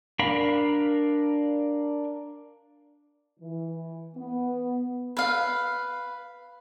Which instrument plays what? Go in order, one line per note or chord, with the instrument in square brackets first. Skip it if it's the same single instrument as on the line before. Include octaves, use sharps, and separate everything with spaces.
[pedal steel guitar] D4 A#4 F5 B5
[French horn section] E3
B3
[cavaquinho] B4 F5